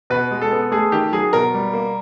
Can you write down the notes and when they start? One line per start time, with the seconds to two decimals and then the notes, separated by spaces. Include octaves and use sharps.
0.10 B2 B4
0.31 G#3
0.42 A4
0.51 B3
0.72 A3 G#4
0.92 D#3 G4
1.12 F#3 G#4
1.33 B2 A#4
1.54 G3
1.74 A#3